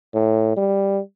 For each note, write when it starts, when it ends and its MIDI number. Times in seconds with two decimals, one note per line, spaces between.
0.14 0.53 45
0.57 1.00 55